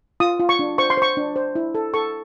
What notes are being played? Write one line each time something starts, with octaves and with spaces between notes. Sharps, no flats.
F4 D#6
F4
C#6
D4
C5 C#6
C6
C5 C#6
D4
C5
E4
A4
A4 C#6